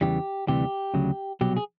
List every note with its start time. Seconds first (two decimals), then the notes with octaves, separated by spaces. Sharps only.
0.01 E2 C#3 E3 G3 G4
0.48 D2 C3 E3 G3 G4
0.94 D2 C#3 F#3
1.41 C2 B2 F#3 G4
1.57 G#4